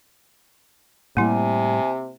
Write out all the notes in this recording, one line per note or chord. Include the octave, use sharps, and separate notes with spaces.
A2 C3 G3 A#3 E4 G#5